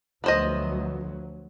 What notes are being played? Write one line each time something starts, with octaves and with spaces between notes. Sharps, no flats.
D2 F3 F#3 B3 C5 D#5